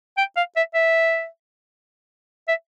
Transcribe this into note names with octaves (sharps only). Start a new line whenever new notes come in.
G5
F5
E5
E5
E5